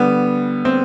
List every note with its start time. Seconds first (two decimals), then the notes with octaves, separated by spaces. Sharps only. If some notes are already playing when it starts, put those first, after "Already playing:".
Already playing: D3 G3 B3
0.65 C4